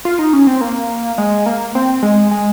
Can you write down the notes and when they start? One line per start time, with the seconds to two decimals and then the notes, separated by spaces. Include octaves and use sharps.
0.05 F4
0.19 D#4
0.33 C#4
0.47 C4
0.61 A#3
1.18 G#3
1.46 A#3
1.75 C4
2.03 G#3
2.31 G#3